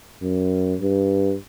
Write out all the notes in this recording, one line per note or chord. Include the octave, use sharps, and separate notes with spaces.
F#2
G2